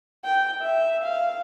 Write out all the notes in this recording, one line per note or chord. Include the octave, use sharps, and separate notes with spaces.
G5
E5
F5